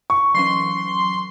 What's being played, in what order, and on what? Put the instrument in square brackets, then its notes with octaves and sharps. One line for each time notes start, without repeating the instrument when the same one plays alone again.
[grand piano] C#6
[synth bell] E3 F#3 C#4 [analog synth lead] C6